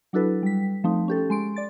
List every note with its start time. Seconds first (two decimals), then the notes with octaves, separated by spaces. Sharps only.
0.13 F#3 D4 E4 F#4 A4 B4
0.43 G3 B6
0.84 F3 A3 C4 D#4
1.08 C#4 G4 A4
1.30 G#3 C6 D7
1.56 D5 A6